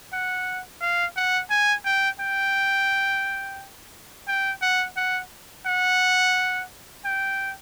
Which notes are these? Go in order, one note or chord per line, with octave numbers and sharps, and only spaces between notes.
F#5
F5
F#5
G#5
G5
G5
G5
F#5
F#5
F#5
G5